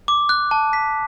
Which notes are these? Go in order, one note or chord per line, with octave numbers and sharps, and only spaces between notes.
D6
F#6
A5
B6